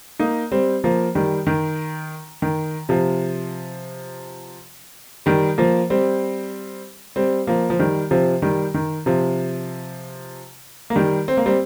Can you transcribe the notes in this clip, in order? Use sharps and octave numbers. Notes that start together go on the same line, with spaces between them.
A#3 D#4
G3 C4
F3 A#3
D#3 G3
D#3
D#3
C3 F3
D#3 G3
F3 A#3
G3 C4
G3 C4
F3 A#3
F3
D#3 G3
C3 F3
D#3 G3
D#3
C3 F3
A#3
D#3 G3
C4
A#3
G3 C4